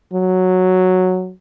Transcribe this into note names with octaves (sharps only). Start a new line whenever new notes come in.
F#3